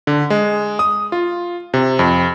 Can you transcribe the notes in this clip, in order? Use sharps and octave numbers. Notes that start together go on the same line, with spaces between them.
D3
G#3
D#6
F4
C3
F2